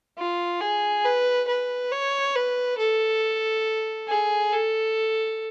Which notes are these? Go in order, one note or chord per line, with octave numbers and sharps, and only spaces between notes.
F4
G#4
B4
B4
C#5
B4
A4
G#4
A4